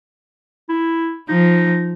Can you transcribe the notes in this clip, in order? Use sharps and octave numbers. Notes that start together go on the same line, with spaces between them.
E4
F3 D#4